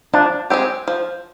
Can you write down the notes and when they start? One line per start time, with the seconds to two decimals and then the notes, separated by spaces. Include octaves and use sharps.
0.14 F3 D4
0.50 G#3 C4 G4
0.88 F3